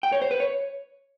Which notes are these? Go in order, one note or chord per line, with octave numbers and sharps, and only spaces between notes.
G5
C#5
C5
B4
C#5